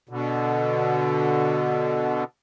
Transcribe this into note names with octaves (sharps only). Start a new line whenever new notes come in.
B2 D3